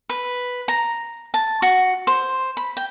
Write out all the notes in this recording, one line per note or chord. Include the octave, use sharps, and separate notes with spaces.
B4
A#5
A5
F#4
C5
B5
G5